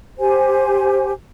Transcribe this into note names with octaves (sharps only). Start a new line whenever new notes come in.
G4 C5 G#5